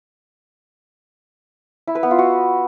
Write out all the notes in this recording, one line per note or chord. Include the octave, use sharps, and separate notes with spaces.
E4
B4
B3
F4
F#4